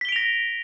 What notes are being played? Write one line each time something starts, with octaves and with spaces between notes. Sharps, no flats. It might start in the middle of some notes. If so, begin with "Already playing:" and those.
A#6 B6 D7 F7 G7